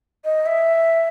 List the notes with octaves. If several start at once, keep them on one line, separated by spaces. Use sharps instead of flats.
D#5
E5